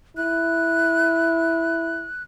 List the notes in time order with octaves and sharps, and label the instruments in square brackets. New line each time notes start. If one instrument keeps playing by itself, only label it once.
[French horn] E4 [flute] F#6